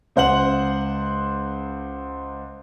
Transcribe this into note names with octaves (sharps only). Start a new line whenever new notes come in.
C#2 C5 F#5 F#7